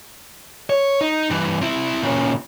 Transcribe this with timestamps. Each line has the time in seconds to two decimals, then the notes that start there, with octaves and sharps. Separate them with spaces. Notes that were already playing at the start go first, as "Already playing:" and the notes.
0.70 C#5
1.01 D#4
1.30 G2 E3
1.61 C3 E4
2.03 A#2 C#3